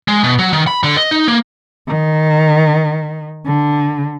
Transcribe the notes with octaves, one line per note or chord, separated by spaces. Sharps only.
G#3
B2
F#3
D#3
B5
D3
D#5
D#4
A#3
D#3
D3